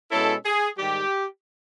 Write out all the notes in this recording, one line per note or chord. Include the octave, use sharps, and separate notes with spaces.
B2 G#3 C#4 E4 A4
G#4
G#2 D#3 G3 G4